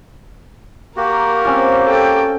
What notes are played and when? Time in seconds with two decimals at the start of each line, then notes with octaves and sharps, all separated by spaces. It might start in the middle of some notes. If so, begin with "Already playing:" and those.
0.97 A#3 F#4 G4 A#4
1.44 C4 C#4 F4
1.85 A4 G5